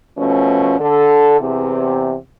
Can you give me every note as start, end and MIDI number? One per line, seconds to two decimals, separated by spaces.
0.18 0.77 47
0.18 0.77 53
0.18 0.77 57
0.18 0.77 61
0.80 1.38 50
0.80 1.38 69
1.40 2.16 40
1.40 2.16 48